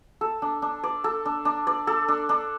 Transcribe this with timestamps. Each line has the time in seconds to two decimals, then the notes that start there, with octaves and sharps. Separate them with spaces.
0.21 A4
0.42 D4
0.62 D4
0.84 D5
1.04 A4
1.25 D4
1.45 D4
1.67 D5
1.87 A4
2.08 D4
2.29 D4